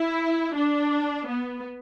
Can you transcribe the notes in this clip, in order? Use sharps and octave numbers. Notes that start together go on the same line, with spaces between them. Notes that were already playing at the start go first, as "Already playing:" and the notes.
Already playing: E4
D4
B3